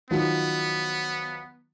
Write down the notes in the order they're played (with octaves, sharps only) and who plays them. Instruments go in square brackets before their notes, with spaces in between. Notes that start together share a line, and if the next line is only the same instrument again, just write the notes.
[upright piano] D#3 F3 F#3 [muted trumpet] B3